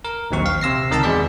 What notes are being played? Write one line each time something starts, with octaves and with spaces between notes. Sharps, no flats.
A#4
A#1 D#2 F#3 C4 C#6
F5
C3 E6 A#6 C7
C#2 D#3 A#4 A5 A#5 E6
E2 B2 G#3 G#4 D5 B6